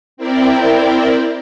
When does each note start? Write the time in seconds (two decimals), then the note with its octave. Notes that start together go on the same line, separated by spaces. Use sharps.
0.17 C4 E4 A#4 D5 G5